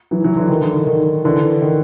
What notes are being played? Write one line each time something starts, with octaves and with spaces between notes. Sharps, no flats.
E3 F#3
E3 F#3
D3 E3
D#3
D3
D#3
D#3
D3 E3
D#3